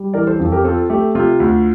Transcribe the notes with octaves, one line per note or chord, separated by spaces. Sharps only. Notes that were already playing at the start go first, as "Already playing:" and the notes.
Already playing: G3
E3 A#4 D5
A4 C5
F2 A4 C5
G4 A#4
C4 F4 A4
A3 G4
C3 F4
D2